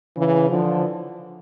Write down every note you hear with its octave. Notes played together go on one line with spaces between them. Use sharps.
C#3 E3
D3 F3